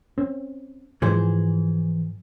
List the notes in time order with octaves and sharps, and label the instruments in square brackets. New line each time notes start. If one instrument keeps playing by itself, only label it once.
[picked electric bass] C4 C#4
[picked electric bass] G#2 F3 [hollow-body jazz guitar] E3 G#4 C5